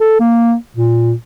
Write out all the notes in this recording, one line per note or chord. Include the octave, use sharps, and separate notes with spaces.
A4
A#3
A#2